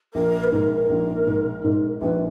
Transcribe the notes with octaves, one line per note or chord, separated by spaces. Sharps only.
A#1 A#4
B4
G#2 A#4
A#1
G#2
G#2
A#1 B4